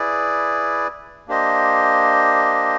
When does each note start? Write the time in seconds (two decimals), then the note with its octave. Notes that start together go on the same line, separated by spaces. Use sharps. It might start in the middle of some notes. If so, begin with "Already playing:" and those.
Already playing: E4 G#4 B4 D5
1.28 A#3 D4 G4 C5 D#5